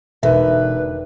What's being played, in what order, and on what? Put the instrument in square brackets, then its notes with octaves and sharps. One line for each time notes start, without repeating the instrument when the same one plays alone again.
[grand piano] E1 [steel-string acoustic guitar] D3 D#3 [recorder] B4 [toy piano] E5